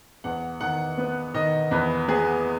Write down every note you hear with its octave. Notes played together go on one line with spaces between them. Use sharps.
E2 F#5
D#3 F#5
B3
D#3 D#5
E2 B4
B3 G#4